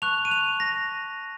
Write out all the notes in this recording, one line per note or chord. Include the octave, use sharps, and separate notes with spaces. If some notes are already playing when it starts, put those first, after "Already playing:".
A5 C#6 F#6 F7
D#7
F7
A#6